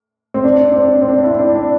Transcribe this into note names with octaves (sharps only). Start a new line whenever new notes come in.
C4
D4
D4
C4
C4
D4
E4
D4
D4